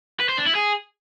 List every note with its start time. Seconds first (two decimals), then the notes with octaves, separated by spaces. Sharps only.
0.20 B4
0.29 C5
0.38 D4
0.46 E4
0.55 G#4